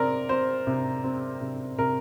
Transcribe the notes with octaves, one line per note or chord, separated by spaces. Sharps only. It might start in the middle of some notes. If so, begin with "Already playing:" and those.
Already playing: C3 C4 A#4 D5
C4 C5
C3
C4
C3
C3 A#4